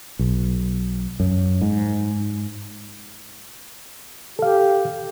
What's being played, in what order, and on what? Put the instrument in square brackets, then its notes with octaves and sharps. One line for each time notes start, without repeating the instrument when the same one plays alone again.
[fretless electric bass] B1
F#2
G#2
[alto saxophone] G4 [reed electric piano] A4 F5